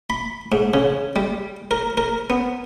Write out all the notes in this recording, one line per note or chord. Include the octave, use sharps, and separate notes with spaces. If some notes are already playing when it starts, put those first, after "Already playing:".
B5
G#2
C#3
G3
A#4
A#4
B3